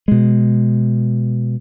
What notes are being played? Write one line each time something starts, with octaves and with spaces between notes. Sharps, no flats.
B2 G#3